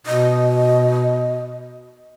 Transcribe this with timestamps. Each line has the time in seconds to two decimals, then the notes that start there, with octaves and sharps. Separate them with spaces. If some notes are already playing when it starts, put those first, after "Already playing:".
0.06 B2 D#5